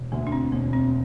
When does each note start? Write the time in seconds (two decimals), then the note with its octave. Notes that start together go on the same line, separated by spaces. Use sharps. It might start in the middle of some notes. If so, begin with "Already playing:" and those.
Already playing: E1
0.12 D2 A#3
0.27 D4
0.32 C4
0.52 E1 A#3
0.73 C4